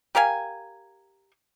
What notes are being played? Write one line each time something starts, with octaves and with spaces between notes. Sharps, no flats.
G4 A#4 F5 G#5